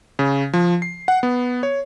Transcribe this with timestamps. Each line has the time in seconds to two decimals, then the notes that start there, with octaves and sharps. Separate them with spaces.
0.19 C#3
0.53 F3
0.82 C7
1.08 F#5
1.23 B3
1.63 C#5